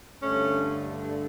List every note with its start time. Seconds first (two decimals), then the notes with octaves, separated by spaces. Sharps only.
0.22 G2 D3 A3 C#4